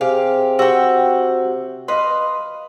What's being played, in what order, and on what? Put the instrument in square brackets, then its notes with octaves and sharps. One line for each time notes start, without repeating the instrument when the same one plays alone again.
[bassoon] C3 [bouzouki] G4 F5 [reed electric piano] G#4
[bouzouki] F#4 G5 [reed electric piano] G4 C5 E6
[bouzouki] B4 D#5 F5 [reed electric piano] C6